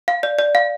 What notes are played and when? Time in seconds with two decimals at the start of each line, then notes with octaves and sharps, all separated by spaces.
0.08 F5
0.23 D5
0.39 D5
0.55 F5